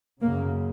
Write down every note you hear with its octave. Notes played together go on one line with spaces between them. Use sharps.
F#2 C#3 A#3